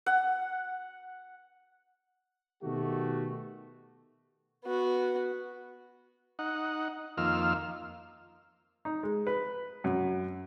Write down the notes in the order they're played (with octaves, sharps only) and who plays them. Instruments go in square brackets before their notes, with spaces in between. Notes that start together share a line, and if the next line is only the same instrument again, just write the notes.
[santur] F#5
[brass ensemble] B2 D#3 A3 F#4 G4
[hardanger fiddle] B3 F#4
[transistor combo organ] D#4 F#5
F2 D#3 A#3 F4 E6 F6
[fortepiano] D#4
G#3
B4
F#2